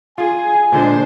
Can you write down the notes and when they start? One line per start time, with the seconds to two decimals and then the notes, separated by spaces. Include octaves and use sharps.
0.18 F4 G#4 G#5
0.72 A#2 D3 G#3 D4 C5